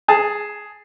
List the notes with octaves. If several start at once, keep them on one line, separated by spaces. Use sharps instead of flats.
G#4 A5